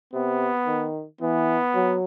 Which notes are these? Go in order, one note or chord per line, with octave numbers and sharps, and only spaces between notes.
C3 B3
D#3
E3 B3
F#3